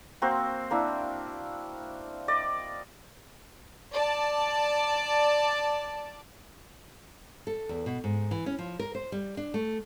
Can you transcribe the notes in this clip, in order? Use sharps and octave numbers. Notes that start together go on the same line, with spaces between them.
A#3 C4 F#4 C5
A#3 D4 E4
D5 D#5
D5 A5
A4
E2
B2
G#2
E3
C#4
F3
A#4
C5
G3
D4
A3